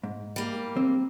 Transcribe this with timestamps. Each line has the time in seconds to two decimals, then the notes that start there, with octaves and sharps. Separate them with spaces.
0.03 G#2
0.36 G3 A#3
0.77 C4